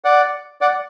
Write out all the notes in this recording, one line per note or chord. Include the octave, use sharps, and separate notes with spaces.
D5 F#5
D5 F#5